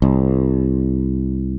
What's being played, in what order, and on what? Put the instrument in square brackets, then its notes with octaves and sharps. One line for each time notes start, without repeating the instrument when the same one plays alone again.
[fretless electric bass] C2